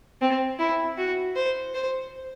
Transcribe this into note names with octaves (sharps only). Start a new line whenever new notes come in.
C4
E4
F#4
C5
C5